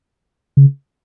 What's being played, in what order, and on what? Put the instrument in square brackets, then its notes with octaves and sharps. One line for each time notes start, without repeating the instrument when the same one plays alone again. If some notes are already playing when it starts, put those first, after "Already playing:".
[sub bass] C#3